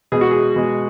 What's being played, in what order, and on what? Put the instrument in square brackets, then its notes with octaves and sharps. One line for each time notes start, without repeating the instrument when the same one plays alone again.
[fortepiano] B2 G#3 G#4
F#4
G#4
B2 G#3